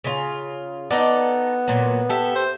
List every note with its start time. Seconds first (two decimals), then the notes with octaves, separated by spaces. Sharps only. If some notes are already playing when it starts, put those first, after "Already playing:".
0.04 C#3 F4
0.91 B3 D#4 A4 D5
1.68 A#2 F#3
2.09 G4 A4 E5
2.35 C5